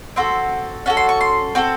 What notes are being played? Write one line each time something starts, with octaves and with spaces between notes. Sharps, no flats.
C4 F#4 A4 C6
C#4 F#4 A4 A5
C6
C#6
C6
C4 F#4 A4